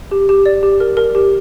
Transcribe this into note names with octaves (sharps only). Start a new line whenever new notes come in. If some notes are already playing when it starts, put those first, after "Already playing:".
G4
G4
D5
G4
A#4
A#4
G4